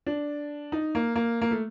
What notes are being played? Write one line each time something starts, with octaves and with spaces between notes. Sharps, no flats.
D4
D#4
A#3
A#3
A#3
A3